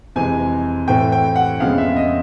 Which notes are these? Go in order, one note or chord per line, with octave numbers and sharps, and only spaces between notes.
F2 C3 E3 G#3 C4 G#5
A2 E3 A3 C4 G5
G5
F#5
F2 C#3 F3 G#3 B3 F5
E5
D#5